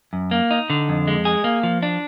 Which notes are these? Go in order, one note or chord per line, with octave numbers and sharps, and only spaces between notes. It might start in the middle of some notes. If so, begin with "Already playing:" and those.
F#2
A#3
D#4
D3
F2
G#3
G#4
A#3
F3
D4